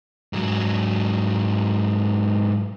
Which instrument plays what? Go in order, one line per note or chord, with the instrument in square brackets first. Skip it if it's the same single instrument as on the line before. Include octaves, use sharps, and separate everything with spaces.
[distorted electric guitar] G#2 F#3